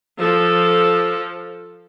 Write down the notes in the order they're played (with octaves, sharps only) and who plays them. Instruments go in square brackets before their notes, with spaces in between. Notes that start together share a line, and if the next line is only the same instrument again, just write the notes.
[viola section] F3 A4